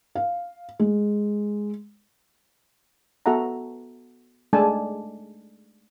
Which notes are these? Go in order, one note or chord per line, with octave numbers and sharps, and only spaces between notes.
F5
G#3
B3 F#4 A4 E5 F#5 A#5
G#3 A3 D4 A4 G#5 A5